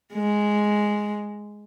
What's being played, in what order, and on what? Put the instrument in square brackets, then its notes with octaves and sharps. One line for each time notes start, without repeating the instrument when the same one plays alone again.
[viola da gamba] G#3